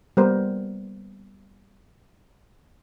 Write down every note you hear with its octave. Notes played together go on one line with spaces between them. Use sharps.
G3 A#3 B3 A#4 C5